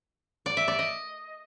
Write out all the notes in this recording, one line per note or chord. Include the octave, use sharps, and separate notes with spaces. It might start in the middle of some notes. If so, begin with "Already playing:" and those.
D5
E5
D5
D#5